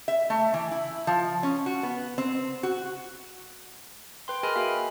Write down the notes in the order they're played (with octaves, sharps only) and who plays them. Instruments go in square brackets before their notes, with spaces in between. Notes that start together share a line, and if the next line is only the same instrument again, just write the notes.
[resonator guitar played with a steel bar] E5
A3
E3
E4
F3
C#4
F#4
B3
C4
F#4
[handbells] B4 G5 C6
G#4 A#4 D#5 G#5 B5 F6
A#3 F#4 E5 F5 G5
B5